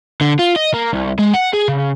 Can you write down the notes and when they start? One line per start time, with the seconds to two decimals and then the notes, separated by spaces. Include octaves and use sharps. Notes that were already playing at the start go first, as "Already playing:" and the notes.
0.21 D3
0.39 F4
0.56 D#5
0.74 A#3
0.93 C2
1.19 G#3
1.34 F#5
1.54 G#4
1.68 C#3